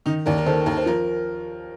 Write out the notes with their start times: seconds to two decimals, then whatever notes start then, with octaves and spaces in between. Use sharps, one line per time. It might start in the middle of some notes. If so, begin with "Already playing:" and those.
0.06 D#3 D#4
0.26 D#2 A#4 D5
0.38 A#4
0.46 D#3 A4 C5
0.66 D#2 A#4
0.77 C5
0.86 F3 A#4